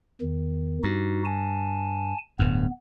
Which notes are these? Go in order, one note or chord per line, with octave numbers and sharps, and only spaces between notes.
E2 D#3
G2 D#4 F#4
G#5 A5
D1 G2 B3